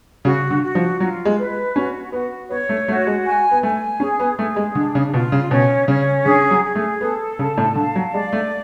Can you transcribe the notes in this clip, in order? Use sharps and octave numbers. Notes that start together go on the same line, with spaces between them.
C#3 F#4
D3
F#4
F3
F#3 F4
G#3
B4
C#4 F#4
B3 F#4
B3 C#5
A3
A3 F#4
G#3
G#5
B3
A3 G#5
C#4 G#4
B3
A3 G#4
G#3
D3 D4
C#3
B2 F4
C#3
B2 C#4
C#3 C#4
D3 G#4
F#3
G#4
A3
B3 A4
C#3 A5
A2
D3 F5
F#3
G#3 D5
A3